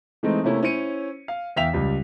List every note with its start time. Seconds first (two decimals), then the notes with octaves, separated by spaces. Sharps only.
0.23 E3 G#3 A3 C4 D#4
0.43 C3 A3 A#3 C#4 E4
0.63 C#4 E4 C5 C#5 C#7 D#7
1.28 F5
1.56 E2 E5 F5 G5 B6 F7
1.73 C#2 G3